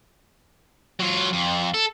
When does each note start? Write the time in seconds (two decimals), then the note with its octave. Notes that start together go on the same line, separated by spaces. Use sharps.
0.99 F#3 F4
1.33 F2
1.74 A4